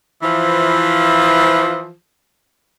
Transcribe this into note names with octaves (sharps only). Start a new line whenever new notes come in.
E3 F3